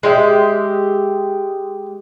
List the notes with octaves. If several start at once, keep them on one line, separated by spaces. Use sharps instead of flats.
G#3 G4 E5